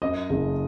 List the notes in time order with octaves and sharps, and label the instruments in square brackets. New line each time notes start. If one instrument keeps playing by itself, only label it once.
[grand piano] F#2 D#5
F#1